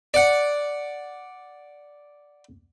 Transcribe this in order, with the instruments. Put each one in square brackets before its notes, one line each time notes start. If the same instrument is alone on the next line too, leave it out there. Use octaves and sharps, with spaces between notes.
[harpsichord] D5 F#5